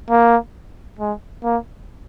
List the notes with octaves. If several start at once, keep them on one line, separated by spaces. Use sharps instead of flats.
A#3
G#3
A#3